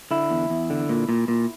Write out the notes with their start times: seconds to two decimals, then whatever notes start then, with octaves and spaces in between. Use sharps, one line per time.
0.11 D3 E4
0.30 E2
0.50 E2
0.70 D3
0.89 A#2
1.09 A#2
1.28 A#2